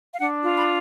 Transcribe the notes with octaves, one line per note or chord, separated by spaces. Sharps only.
F5
D4 F#5
F4
B5